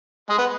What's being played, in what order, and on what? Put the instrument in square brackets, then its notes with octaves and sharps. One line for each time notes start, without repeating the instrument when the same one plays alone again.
[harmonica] G#3
B3